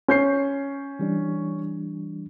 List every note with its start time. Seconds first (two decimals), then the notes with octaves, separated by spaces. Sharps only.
0.08 C#4 G6 C7
0.99 E3 G3 D4